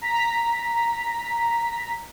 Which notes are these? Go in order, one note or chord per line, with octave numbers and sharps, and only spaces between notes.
A#5 B6